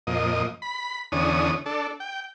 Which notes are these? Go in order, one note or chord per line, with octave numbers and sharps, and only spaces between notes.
F2 A#2 D#5
B5
E2 D3 C#4 D#6
D4 A4
G5